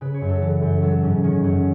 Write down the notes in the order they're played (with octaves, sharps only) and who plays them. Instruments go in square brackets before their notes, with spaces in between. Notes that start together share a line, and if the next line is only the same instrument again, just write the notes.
[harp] C#3 B4
C#5
F#2
A4
E3 A4
F#2
F#3 A4
G#2 C#4
D#3 C#4
F#2 C#4